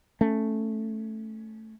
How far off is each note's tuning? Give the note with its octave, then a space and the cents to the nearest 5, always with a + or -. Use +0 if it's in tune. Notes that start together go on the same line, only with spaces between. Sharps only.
A3 +0 C#4 +0